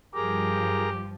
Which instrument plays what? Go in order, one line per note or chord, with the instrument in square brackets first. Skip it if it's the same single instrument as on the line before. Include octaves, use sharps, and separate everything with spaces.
[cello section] G2 F3 [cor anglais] G4 [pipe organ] G#4 A#4 A#5